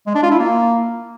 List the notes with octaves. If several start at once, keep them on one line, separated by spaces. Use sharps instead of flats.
G#3
D4
F4
E4
A#3